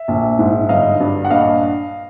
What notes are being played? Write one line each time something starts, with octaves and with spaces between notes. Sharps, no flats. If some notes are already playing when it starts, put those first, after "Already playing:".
Already playing: E5
A#1
G#2
G1 D#5 F5
G2
F#5
A#1 D#5 F5